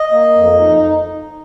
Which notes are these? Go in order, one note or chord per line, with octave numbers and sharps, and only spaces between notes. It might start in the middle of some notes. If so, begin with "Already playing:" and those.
Already playing: D#5
A#3
F2
D#4